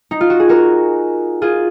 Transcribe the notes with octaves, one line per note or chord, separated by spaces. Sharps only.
D#4
F4
F#4
G#4
F#4 A#4
F4 G#4